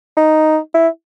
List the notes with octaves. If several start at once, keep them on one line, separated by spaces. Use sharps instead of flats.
D#4
E4